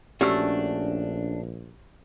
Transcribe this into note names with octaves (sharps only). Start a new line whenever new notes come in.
A#1 A3 C#4 D4 F#4 G4 E6